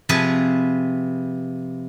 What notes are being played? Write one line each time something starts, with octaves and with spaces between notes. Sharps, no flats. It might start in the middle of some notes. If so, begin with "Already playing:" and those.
C3 F3 G#4 B4 G#5 A5